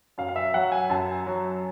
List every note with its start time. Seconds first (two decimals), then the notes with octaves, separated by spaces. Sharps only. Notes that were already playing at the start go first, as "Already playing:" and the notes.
0.18 F#2 F5
0.28 F5
0.36 E5
0.54 F#3 F#5
0.72 G#5
0.90 F#2 A5
1.27 F#3